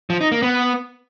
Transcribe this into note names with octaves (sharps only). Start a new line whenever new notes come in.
F3
D#4
A#3
B3